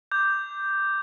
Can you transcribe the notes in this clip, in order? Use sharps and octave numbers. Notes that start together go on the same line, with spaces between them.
D6 G6